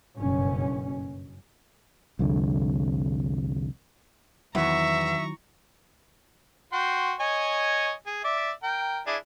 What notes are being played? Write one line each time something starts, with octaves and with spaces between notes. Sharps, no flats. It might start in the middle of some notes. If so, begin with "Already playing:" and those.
F#1 G2 B2 C#4
C2 F2 D3
E2 D#3 F#3 E5 A#5 C#6
F#4 G5 C6
C#5 D#5 G#5
G#4
D5 E5
A#4 G5
D4 E4 G#4